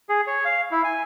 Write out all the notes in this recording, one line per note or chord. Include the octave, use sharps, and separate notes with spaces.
G#4
C#5
F5
E4
G#5